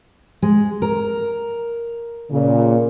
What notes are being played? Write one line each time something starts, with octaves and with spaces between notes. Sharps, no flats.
G#3
A#4
A#2 C#3